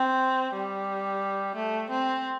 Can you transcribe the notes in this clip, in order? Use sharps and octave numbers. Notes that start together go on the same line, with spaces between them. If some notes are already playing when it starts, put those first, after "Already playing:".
Already playing: C4
G3
A3
C4